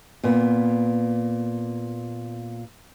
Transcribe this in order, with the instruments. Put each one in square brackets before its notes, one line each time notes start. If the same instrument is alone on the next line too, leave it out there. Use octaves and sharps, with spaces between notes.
[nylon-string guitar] A#2 B3